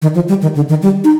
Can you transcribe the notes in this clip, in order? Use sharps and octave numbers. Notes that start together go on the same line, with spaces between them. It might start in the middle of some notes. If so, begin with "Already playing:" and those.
D#3
F3
G3
D#3
D3
D#3
G3
D#4